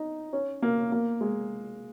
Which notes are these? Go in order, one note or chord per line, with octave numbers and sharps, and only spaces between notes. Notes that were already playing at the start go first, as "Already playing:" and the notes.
Already playing: D#4
C#4
A#3
A#3
G#3